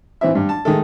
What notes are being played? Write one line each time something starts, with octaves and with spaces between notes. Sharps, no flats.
E3 C4 E4 E5
G2
A5
D#3 G#3 A3 A4